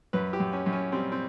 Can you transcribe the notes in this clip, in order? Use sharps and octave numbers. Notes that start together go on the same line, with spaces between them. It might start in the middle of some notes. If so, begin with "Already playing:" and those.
F#2 B4
G4
F#2
C#4
F#2
C#4
G3 C4
C4